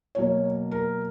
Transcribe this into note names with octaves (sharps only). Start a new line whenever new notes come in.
B2 F#3 A#3 C#5
A#4